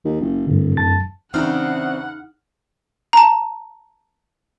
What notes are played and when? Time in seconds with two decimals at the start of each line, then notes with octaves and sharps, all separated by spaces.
0.05 D#2
0.21 F#1
0.47 D1 G2 D3
0.77 F#2 A5 A6
1.34 E2 C#3 C4 D4 D#4 F#5 F6
3.13 A5 A#5